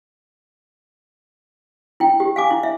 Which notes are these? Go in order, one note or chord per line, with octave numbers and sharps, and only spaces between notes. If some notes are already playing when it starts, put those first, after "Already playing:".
E4 G5
G4
F5 G#5 D6
E4
E5